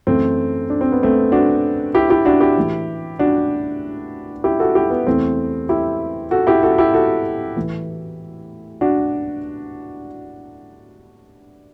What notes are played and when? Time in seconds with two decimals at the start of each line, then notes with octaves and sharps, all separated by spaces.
0.07 F#2 E3 A3 C4
0.70 D4
0.81 C4
0.92 B3
1.03 A3 C4
1.32 D4 F#4
1.94 E4 G4
2.10 E4 G4
2.25 D4 F#4
2.41 E4 G4
2.57 A2 E3
3.19 D4 F#4
4.44 E4 G4
4.60 F#4 A4
4.75 E4 G4
4.90 B3
5.07 E2 C3 E3 A3 C4
5.69 E4 G4
6.31 F#4 A4
6.47 E4 G4
6.63 F#4 A4
6.78 E4 G4
6.94 F#4 A4
7.56 A2 E3
8.81 D4 F#4